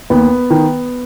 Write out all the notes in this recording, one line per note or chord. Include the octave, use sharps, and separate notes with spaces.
D#2 B3
D#3